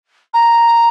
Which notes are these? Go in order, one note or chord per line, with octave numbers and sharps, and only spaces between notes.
A#5